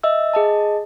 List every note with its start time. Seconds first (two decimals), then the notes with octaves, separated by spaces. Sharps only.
0.03 D#5 E5 E6
0.34 G#4 D#5 A5